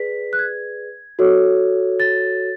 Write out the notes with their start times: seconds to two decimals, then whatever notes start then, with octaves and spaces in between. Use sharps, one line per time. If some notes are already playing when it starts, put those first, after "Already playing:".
Already playing: G#4 B4 D5 B6
0.33 F#6
0.39 G#6
1.19 F#4 A4 C#5
2.00 A6